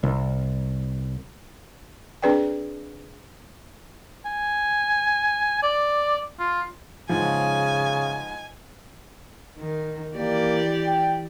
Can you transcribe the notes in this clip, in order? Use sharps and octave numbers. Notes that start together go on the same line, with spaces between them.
C2
C4 D4 G#4 B4 D5 G5
G#5
D5
F4
G#2 C#3 F3 G#5
D#3
E3 A#3 G4 D5
G5